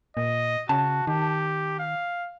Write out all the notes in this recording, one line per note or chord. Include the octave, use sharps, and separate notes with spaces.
A#2 D#5
C#3 F#4 A5
D#3 G4
F5